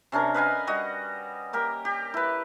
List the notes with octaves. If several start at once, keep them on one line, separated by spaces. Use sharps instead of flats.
C3 C#4 D4 A#4
B4 D#5 F5 G#5
G3 F#4 D#5
A#3 G4 A#4
G4
E4 B4